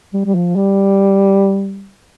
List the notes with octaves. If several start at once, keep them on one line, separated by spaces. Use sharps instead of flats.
G3
G3
F3
G3